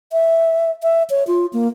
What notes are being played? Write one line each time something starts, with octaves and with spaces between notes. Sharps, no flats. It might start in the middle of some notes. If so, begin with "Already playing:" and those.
E5
E5
C#5
F4
A#3